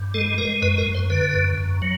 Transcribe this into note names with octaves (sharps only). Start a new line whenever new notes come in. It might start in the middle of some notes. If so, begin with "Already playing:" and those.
Already playing: G2
G#3 A4
G#3 A#4
F#2 B4
A#4
F#2
C5
D3 B4
F#2
F#2
F#3